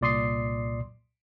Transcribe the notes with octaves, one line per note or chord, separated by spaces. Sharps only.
C2 A#2 D5 C6 D#6 C7